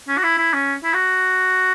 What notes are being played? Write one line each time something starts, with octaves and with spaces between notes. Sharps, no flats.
C#4
F#4
E4
E4
C#4
E4
F#4